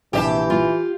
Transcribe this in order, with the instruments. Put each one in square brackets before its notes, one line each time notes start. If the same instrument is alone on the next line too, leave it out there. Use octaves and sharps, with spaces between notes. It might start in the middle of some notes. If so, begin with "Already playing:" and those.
[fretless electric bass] A#1 [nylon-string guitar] C3 D#5 A5 [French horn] E3 [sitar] G4
[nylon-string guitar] F4